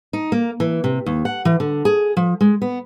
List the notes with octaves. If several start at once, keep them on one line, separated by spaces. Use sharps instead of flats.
D#4
A#3
E3
C3
D#2
F#5
E3
D3
G#4
F3
G#3
B3